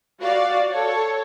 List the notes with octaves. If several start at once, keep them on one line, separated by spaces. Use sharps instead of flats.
F#4 D5 F5
A4 C#5